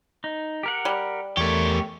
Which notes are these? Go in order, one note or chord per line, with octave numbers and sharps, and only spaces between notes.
D#4
G4 A#4 F#5
G3
E2 A3 G4 A#4 C#5